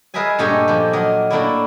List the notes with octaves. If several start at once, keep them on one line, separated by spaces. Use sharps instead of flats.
G#4 A#4 B4 D#5 E5 G#5
G2 A#2 A3 G4 D#5 G#5
A#2 F3
F#3 A#4 D#5
A2 A#3 D4 E4